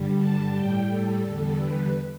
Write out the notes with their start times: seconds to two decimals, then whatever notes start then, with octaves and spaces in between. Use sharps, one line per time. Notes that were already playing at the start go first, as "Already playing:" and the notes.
Already playing: G2 D3 G3
0.16 A5
0.52 A2 G3 G5
0.86 A4
1.22 E2 D3 G3
1.56 B4